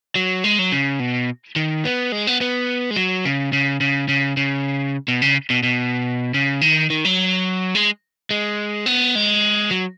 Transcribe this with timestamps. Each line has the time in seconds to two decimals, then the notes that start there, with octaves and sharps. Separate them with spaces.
0.16 F#3
0.44 G#3
0.59 F#3
0.72 C#3
1.00 B2
1.56 D#3
1.85 B3
2.12 G#3
2.27 B3
2.41 B3
2.91 G#3
2.96 F#3
3.25 C#3
3.53 C#3
3.81 C#3
4.09 C#3
4.37 C#3
5.08 B2
5.22 C#3
5.50 B2
5.63 B2
6.34 C#3
6.61 D#3
6.90 D#3
7.05 F#3
7.75 G#3
8.31 G#3
8.86 B3
9.15 G#3
9.71 F#3